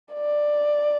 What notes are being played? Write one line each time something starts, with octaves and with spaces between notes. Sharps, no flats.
D5